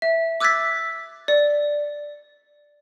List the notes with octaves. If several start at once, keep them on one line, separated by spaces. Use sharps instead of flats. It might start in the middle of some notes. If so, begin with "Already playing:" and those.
E5
D6 E6 F#6 G#6 A6 B6
D5